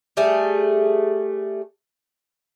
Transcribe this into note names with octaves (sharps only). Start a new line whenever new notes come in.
G3 A3 G#4